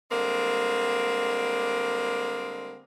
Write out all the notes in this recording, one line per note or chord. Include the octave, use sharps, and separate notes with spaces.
D3 G3 G#3 A#3 C4